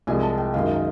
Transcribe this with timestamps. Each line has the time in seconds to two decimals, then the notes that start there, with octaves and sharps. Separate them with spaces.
0.07 C2 C3 F3 G#3 G#5
0.23 A5
0.38 G5
0.54 F#2 D#3 G#3 F5
0.69 D#5